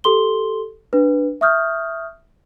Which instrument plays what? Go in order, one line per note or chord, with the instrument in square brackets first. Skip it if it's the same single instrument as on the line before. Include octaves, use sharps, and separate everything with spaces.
[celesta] G4 A4 C6 G7
D4 B4
E5 C#6 D#6 F6 G6